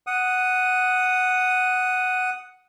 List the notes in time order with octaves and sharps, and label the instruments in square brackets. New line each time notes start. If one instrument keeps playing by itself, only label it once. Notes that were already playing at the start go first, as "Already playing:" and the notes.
[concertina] F#5 D#6